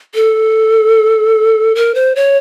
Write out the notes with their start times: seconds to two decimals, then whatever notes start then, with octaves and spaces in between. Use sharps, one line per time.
0.15 A4
1.75 A#4
1.95 C5
2.16 C#5